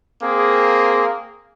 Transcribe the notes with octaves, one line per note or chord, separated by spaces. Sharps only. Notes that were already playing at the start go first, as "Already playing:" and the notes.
A#3 C4 G#4